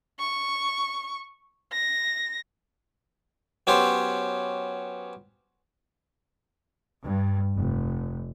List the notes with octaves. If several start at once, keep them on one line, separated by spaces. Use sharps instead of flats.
C#6
A#6
F#3 B3 C#4 G4 C5
G2
F1